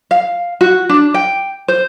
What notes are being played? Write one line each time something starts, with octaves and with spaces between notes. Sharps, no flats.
F5
F#4
D4
G5
C5